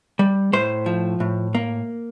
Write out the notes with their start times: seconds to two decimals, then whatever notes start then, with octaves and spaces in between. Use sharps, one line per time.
0.19 G3
0.53 A2 C5
0.86 F3
1.20 A2
1.55 A#3